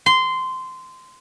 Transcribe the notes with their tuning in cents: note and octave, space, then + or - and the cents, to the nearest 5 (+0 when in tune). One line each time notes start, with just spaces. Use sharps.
C6 -15